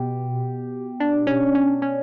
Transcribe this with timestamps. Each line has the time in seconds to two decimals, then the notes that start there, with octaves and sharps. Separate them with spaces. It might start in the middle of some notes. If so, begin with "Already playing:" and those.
Already playing: B2 G4
1.00 D4
1.27 C#4
1.55 C#4
1.82 C#4